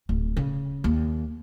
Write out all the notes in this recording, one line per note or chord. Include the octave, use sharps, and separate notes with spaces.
D1
C#3
D#2